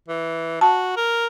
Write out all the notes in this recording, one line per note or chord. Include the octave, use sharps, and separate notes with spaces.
E3
F#4 A5
A#4